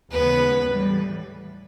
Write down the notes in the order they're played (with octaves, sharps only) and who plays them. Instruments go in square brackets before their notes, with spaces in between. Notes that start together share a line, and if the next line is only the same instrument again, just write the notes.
[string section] D#2 C#3 E3 G#3 B3 [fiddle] B4
[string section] A2 E3 G3